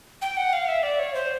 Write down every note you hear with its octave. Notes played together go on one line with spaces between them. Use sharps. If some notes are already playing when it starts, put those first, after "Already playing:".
G5
F#5
F5
E5
D5
C#5
C5